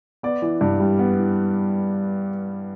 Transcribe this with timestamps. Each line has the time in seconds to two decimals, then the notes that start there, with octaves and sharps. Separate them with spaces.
0.23 B3 D5
0.42 E3
0.61 G2
0.80 G3
0.99 B3
1.18 E3